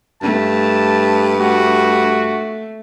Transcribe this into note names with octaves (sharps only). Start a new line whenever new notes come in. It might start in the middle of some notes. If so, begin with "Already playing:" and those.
G2 A3 A5
A3 F#4